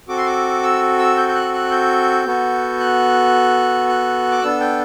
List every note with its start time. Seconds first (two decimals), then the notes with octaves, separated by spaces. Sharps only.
0.08 C4 F#4 A4 D6
0.18 C6
0.26 D6
0.63 E6
0.99 E6
1.17 G6
1.29 G6
1.35 F#6
1.54 F#6
1.71 G6
2.26 B3 F#4 A4
2.80 F#6
3.89 F#6
4.32 D6
4.42 B3 D4 A4 E6
4.60 G5